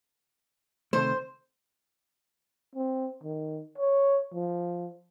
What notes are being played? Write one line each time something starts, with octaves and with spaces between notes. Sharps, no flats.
C3 D#3 A3 C5
C4
D#3
C#5
F3